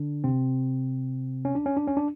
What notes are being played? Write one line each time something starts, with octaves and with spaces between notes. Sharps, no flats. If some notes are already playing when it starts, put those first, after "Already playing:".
Already playing: D3 D4
C3 C4
C#4
D4
C#4
D4
C#4
D4